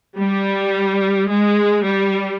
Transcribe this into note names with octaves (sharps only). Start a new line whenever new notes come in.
G3
G#3
G3